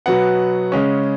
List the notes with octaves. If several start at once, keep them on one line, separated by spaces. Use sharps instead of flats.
B2 F#3 B3 F#5
C#3 G#3 C#4